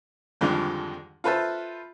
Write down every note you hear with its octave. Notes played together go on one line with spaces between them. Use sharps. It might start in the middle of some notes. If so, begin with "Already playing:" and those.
F2 G#2 D3 D#3 F3 G3
F4 A4 B4 C5 E5 A5